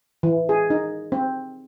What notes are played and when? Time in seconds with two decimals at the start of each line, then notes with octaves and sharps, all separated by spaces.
0.23 E3
0.49 G#4
0.70 D#4
1.12 C4